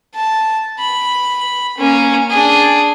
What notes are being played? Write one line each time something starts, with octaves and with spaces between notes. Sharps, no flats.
A5
B5
A#3 C#4
D4 G#4